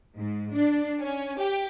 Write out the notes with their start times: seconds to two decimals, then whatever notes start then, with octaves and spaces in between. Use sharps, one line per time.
0.15 G#2
0.54 D4
0.99 C#4
1.38 G4